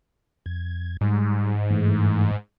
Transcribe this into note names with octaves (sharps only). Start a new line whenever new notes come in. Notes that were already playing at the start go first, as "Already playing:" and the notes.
F2 G#6
G#2 G3
G2 E3 A3